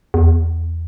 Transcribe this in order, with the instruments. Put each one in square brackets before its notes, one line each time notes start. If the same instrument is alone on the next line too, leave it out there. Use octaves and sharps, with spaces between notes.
[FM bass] E2